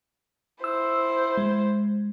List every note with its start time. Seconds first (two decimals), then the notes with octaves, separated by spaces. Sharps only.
0.64 E4 C5 E6
1.37 G#3